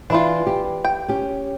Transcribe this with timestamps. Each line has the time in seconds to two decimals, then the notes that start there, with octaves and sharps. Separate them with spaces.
0.10 E3 D4 E4 F4
0.47 G4
0.85 G5
1.08 C#4 G4